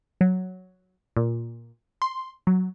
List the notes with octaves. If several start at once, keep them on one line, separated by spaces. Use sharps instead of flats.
F#3
A#2
C6
F#3